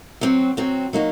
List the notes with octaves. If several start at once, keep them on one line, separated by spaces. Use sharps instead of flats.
F#3 C4 F#4
F#3 C4 F#4
F#3 A#3 D#4 F#4